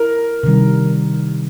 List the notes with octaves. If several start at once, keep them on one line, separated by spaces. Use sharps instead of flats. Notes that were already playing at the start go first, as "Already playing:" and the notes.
Already playing: E4 A#4
C3 D#3 G3